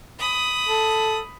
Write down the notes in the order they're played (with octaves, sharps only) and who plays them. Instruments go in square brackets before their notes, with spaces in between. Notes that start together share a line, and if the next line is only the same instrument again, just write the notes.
[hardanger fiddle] B5 D#6
[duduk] A4